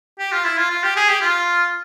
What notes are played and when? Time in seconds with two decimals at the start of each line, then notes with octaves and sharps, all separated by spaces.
0.19 G4
0.32 F4
0.45 E4
0.57 F4
0.70 F4
0.83 G4
0.96 G#4
1.09 G4
1.21 F4